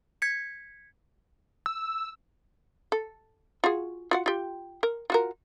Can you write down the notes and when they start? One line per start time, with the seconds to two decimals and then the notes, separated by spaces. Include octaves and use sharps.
0.22 G#6 B6 C#7
1.66 E6
2.92 A4
3.64 F4 F#4 G#4
4.11 F4 F#4 F#5
4.26 F4 G4
4.83 A#4
5.10 F4 F#4 A#4